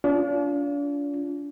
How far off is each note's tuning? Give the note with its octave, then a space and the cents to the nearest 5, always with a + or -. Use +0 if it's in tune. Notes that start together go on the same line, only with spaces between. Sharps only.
D4 -40 F4 +0